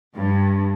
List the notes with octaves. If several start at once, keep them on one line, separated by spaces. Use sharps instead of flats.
G2